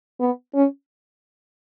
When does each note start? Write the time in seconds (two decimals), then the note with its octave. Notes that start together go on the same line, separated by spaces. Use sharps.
0.20 B3
0.54 C#4